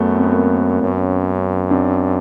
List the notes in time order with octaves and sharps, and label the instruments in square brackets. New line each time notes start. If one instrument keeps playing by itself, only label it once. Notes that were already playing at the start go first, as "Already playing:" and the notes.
Already playing: [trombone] F#2 [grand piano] A3 B3
[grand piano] C4
B3
A#3 C4
[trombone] F#2 [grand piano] B3 C#4
[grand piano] C4 D4